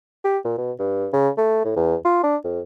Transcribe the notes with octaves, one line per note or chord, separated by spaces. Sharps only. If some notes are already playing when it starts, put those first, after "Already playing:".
G4
A#2
B2
G2
C#3
A3
A2
E2
F4
D4
F2